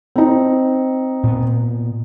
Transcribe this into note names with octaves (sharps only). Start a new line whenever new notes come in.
C4 D#4
A#2 B3